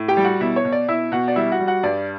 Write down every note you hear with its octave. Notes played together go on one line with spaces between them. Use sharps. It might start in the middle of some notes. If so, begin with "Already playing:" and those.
Already playing: A2
G4 G5
G3
F#4 F#5
B2 E4 E5
C#5
B2
D5
B2 E4 E5
B2 F#4 F#5
D5
G3 E4 E5
F#4 F#5
G3
F#4 F#5
G2 D5